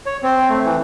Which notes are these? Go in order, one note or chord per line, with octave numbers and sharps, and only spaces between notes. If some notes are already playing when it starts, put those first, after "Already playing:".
C#5
C4
A3
E3